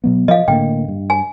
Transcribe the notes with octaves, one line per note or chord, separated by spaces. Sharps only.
B2 F#3 B3
F3 D#5 F5
A2 D3 A#3 G5
G2
G#5